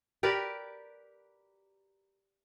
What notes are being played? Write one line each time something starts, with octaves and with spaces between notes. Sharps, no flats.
G4 A#4 B4 D5